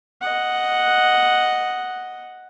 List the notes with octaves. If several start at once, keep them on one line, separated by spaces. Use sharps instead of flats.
D#5 F#5